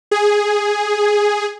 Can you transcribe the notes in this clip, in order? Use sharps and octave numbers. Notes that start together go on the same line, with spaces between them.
G#4